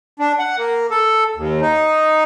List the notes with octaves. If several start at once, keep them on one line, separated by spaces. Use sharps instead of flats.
D4
F#5
A#3
A4
D#2
D#4